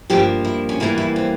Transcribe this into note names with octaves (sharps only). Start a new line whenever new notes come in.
G2 F3 A#3 G4
E4
C#4
E2 E3 G3 A#3 E4
E4
C4